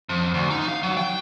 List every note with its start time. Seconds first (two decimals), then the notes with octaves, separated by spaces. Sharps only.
0.09 F2
0.34 D2
0.50 D#4
0.68 F5
0.83 F#3
0.97 G5